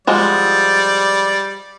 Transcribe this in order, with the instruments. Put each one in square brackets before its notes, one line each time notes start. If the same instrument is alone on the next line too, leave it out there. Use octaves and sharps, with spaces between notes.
[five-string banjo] F3 G#3 F#4 [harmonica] G3 D5